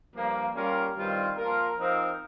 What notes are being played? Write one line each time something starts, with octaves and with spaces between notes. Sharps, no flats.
G2 F3 A#3
G3 A#3 C#4 F4 A#4
G2 D#3 G3 C4 F4
F3 A#3 F4 A#4
F3 C4 D#4 A#4